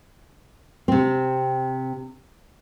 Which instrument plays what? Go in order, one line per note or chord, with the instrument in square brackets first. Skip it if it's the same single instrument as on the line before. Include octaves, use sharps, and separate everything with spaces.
[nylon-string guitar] C3 C4